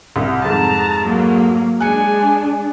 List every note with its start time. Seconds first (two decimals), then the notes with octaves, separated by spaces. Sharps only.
0.16 C2
0.45 F2 G#2 A5 A#5
1.04 F#3 A#3
1.80 G#3 D4 G#5 F#6 C#7